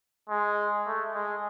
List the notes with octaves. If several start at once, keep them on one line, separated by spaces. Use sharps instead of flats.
G#3
A3
G#3